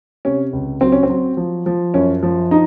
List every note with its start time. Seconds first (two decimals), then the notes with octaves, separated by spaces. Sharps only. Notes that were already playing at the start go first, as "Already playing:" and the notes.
0.25 C3 C#4
0.53 C#2
0.81 F#3 C4
0.92 C#4
1.03 C4
1.09 F#3
1.37 F3
1.66 F3
1.94 F#2 C#4
2.23 F3
2.51 D#4